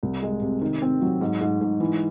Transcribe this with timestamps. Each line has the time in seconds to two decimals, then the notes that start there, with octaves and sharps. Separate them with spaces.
0.03 C2
0.22 G#3
0.42 C3
0.61 D#3
0.82 C4
1.02 F#3
1.21 G#2
1.41 G#2
1.61 G#2
1.80 E3